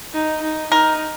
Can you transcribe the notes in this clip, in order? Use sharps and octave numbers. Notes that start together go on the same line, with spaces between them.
D#4
D#4
D#4 A#4